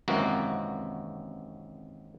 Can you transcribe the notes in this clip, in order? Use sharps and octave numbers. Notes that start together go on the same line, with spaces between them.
G#1 F#2 C3 E3 A#3 F#4